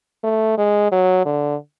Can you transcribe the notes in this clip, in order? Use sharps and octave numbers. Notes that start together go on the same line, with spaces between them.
A3
G#3
F#3
D3